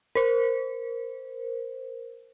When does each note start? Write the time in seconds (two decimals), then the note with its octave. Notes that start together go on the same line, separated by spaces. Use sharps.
0.15 A#4 C5